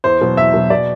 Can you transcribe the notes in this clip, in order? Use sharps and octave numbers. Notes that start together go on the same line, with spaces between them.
E2 C5
B2 F#3
E2 E5
B2 F#3
B2 D5